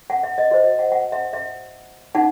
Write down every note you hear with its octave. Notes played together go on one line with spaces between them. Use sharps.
F#5
E5
D#5
F#4 C5 D#5
D#5
F#5
F#5
E5
E5
D#4 F#5